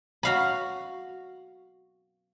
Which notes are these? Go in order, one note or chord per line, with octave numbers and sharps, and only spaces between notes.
F#4 F5 B5